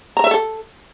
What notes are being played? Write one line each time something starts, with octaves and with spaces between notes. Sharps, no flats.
A#5
E5
A4